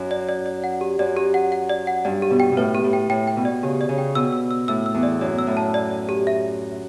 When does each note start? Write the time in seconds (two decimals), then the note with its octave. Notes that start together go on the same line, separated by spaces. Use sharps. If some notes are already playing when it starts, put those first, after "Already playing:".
Already playing: F#2
0.11 D5
0.29 D5
0.46 D5
0.64 F#5
0.81 G4
0.99 F#2 D5
1.17 G4
1.34 F#5
1.52 F#5
1.69 D5
1.87 F#5
2.05 G2 D5
2.22 G4
2.31 B2
2.40 G5
2.52 B2
2.57 A2 B4
2.75 G4
2.84 A2
2.93 G5
3.10 A2 G5
3.27 G5
3.36 B2
3.45 D5
3.63 C#3 G4
3.81 D5
3.89 C#3
3.98 G5
4.15 B2 E6
4.33 E6
4.51 E6
4.68 A2 E6
4.86 E6
4.94 E2
5.03 D5
5.21 F#2 D5
5.39 E6
5.47 A2
5.57 A5
5.74 D5
5.91 D5
6.09 G4
6.27 E5